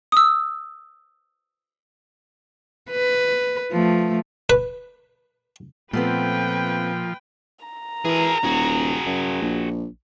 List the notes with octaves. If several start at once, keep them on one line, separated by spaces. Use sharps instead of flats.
D#6 E6
B4
F3 A3
B4
A#2 F3 A3 B3 C4 B4 G5
A#5
E3 G#4 A#4
D#1 F#4 G#4
F#2
A#1